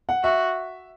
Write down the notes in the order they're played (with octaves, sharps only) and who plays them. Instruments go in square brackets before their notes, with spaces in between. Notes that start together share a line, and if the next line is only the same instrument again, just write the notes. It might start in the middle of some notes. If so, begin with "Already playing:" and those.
[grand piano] F#5
[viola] F#4 [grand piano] E5